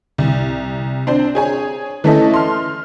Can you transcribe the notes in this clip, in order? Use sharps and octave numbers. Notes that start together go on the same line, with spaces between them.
C2
C4 D4 C5
G#4 C#5 G#5
E3 A3 C#4 E4 A4 D#5
C6 F6